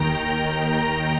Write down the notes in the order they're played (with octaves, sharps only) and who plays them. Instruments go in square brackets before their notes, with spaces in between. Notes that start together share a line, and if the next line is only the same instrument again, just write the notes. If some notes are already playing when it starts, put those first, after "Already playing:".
Already playing: [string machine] D#2 D#3 G5 A#5